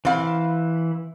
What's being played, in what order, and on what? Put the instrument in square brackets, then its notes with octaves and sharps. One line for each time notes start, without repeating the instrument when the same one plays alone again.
[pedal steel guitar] E3 B5 [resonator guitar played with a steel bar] C4 F5